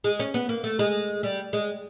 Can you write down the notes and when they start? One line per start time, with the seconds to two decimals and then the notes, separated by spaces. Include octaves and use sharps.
0.04 G#3
0.19 C#4
0.34 B3
0.49 A#3
0.64 A3
0.79 G#3
1.23 G3
1.53 G#3